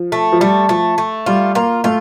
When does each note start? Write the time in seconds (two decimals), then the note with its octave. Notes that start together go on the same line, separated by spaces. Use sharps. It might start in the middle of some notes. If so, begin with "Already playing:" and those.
Already playing: F3
0.12 A3
0.32 F3
0.40 G3 A3
0.69 F3 A3
0.98 A3
1.26 G3 F4
1.55 A#3 F4
1.84 A3 F4